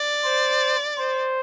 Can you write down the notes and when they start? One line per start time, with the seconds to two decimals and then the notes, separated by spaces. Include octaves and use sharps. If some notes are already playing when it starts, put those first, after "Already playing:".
Already playing: D5
0.25 C5
0.98 C5